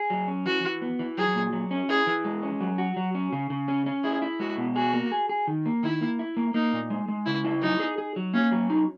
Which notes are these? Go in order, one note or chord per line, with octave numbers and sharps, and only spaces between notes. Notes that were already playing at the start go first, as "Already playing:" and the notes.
Already playing: G#4
F#3
C#4
E3 F#4
E3
B3
E3
F#3 G#4
A#2
F#3
C#4
E4 G#4
E3
G#3
C#4
F#3
F#4
F#3
C#4
C#3
C#3
C#4
C#4
E4 G#4
E4
G#3 F#4
B2
F#4 G#4
A#3
G#4
G#4
D#3
A#3
D#3 E4
A#3
E4
A#3
A#3 D#4
A#2
G#3
G#3
C#3 E4
E4
F#3 D#4
G#4
G#4
F#3
A#3 C#4
F#3
D#4